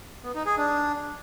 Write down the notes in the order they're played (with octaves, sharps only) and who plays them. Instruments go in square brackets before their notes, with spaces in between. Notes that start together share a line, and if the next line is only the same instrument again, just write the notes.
[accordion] B3
D#4
G#4
D4